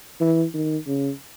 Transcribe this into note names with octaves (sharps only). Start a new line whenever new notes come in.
E3
D#3
C#3